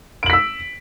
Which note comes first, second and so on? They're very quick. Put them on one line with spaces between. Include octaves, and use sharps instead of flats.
D7 F#7 B6 E6